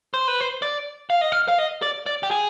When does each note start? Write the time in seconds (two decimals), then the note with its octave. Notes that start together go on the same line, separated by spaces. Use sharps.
0.14 C5
0.28 B4
0.41 C5
0.62 D5
1.10 F5
1.21 D#5
1.32 F5
1.48 F5
1.58 D#5
1.82 D5
2.06 D5
2.23 G4
2.31 G#4